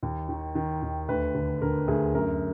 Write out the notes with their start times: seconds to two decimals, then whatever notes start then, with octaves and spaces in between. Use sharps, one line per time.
0.03 D#2
0.29 D#3
0.55 D#3
0.82 D#2
1.08 D2 B4
1.35 D3
1.62 D3 A#4
1.88 D2 G#4
2.15 F#2 A#4